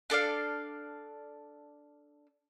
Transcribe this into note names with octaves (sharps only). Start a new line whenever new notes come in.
D4 A4 D5 F5